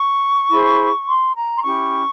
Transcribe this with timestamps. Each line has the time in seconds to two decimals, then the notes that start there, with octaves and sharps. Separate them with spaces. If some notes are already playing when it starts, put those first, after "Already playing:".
Already playing: C#6
0.49 E4 G#4 C5
1.07 C6
1.35 A#5
1.57 C6
1.63 C#4 E4 G4 C#6